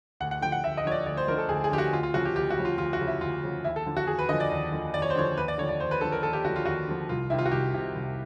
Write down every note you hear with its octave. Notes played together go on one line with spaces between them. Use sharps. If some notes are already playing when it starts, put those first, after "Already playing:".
D2 F#5
F#5
D3 F3 G5
F#5
D2 E5
D#5
D3 F3 C#5
D5
D2 D5
C5
D3 F3 A#4
A4
D2 G#4
G#4
D3 F3 G4
F#4
D2 F4
F4
C#3 F3 F#4
G4
D2 G4
F#4
C#3 F3
F4
D2 F4
F#4
C#3 F3
E4
D2 F4
C#3 F3
D#2 E4
A4
D3 F3
F#4
D#2 G#4
B4
D3 F3 D#5
D5
D#2
D3 F3
D#2 D5
C#5
C5
D3 F3 C#5
D#2 B4
D5
D3 F3 C#5
D5
D#2 C5
B4
D3 F3 A4
A#4
D#2 A4
G4
D3 F3 F#4
F4
D#2 F#4
D3 F3
C2 F4
C3 D#3 E4
F4
F#4
C2 G4
C3 D#3
C2